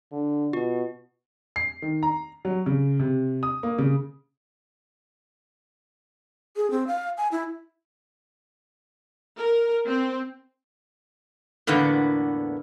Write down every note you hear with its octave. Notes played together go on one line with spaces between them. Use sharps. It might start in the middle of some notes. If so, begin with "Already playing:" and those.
D3
B2 F4
C7
D#3
A#5
F#3
C#3
C3
D#6
A#3
C#3
G#4
C4
F5
G#5
E4
A#4
C4
E2 A2 D3 A#3 B3